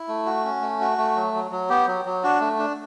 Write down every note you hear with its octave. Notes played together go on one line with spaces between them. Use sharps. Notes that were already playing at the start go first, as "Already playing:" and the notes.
Already playing: E4
A3
F#4
C#4
A3
F#4
A3
F#3
F#3
F#3
B3 G4
F#3
F#3
D4 F#4
A3
D4